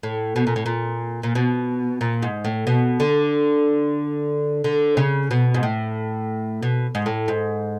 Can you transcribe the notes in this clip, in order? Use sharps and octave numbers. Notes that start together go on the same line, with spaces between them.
A2
B2
A#2
A2
A#2
A#2
B2
A#2
G#2
A2
B2
D3
D3
C#3
B2
G#2
A2
B2
G#2
A2
G#2